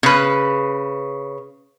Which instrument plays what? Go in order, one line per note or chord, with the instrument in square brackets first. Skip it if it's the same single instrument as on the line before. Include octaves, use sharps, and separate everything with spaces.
[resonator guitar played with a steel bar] C#3 B4